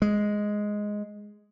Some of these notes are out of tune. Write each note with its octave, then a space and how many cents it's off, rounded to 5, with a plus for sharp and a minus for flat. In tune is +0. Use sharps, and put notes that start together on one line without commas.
G#3 +0